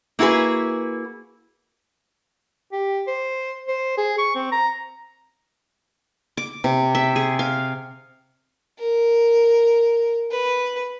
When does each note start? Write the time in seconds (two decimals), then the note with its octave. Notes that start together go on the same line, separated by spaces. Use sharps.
0.19 A#3 E4 F#4 G#4 B4
2.72 G4
3.07 C5
3.68 C5
3.98 G#4
4.18 C#6
4.35 C4
4.52 A#5
6.37 D6
6.64 C3
6.95 E5
7.16 G#4
7.39 F5
8.79 A#4
10.31 B4